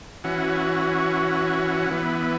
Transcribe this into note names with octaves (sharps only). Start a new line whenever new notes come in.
E3 C#4 F#4
E3 B3